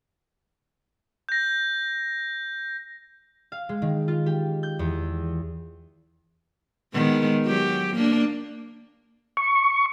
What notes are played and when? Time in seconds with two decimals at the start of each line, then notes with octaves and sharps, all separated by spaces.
1.29 G6 A#6
3.52 F5
3.69 G#3
3.82 D#3
4.08 F4
4.26 G4
4.63 G6
4.79 E2
6.94 D#3 G#3 B3
7.45 F#3 G4
7.94 A#3 D4
9.37 C#6